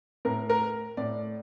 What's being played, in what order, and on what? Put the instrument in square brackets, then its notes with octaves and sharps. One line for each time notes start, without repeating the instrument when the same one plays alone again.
[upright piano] A2 A#4
A#4
A2 D5